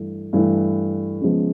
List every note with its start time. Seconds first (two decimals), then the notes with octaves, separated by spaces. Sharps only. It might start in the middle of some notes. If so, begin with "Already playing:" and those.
Already playing: G2 E3 A3
0.33 G2 E3 A3
1.21 C#3 F3 G#3 B3